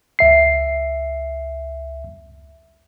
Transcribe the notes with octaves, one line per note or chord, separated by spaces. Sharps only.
C#2 E5 C7